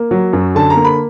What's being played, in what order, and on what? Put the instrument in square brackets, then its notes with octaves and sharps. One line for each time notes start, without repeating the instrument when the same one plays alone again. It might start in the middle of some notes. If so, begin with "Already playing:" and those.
Already playing: [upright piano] A#3
F#3
F#2
D3 A5
A#5
A#3
B5